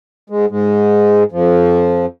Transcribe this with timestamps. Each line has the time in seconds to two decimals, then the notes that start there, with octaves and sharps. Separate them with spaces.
0.30 G#2 G#3
0.50 G#2 G#3
1.32 F2 F3